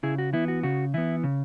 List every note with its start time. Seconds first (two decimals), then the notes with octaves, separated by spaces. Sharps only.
0.03 C#3 E4 G#4
0.18 F#4
0.33 E3 B3 E4
0.48 F#4
0.63 C#3 F#4
0.94 E3 B3 E4
1.24 C#3